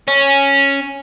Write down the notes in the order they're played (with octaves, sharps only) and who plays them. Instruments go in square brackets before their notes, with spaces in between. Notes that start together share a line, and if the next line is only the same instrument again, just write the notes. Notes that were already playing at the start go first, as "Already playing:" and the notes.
[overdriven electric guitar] C#4